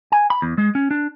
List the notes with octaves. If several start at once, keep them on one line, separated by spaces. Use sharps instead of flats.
G#5
B5
E2
G#3
C#4
D4